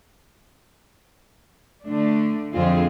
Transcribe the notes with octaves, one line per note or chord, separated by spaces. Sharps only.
D3 A3 D4
F2 D3 F3 C4 F4 G#4